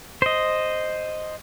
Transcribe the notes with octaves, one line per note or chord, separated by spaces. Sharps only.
C5 D#5